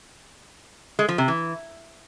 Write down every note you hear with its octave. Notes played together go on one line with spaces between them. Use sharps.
G#3
F3
C3
E3